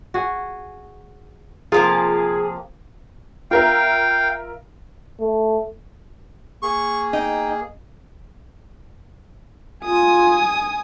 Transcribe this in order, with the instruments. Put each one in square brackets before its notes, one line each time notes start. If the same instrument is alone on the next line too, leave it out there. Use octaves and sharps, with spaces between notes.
[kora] F#4 G#4
[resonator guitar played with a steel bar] C3 F3 A#3 [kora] F4 [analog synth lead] G#4
[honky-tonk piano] F4 A#4 E5 [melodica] F5 G5
[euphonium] A3
[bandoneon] A#3 G#4 [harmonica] C#6
[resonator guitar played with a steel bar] D#4 [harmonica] G5
[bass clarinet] F4 [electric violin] G#5 D#6